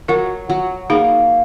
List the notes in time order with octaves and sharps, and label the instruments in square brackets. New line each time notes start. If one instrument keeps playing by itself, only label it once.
[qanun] F#3 [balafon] F#4 A#4
[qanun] F#3
[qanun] A#3 [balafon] D#4 G#4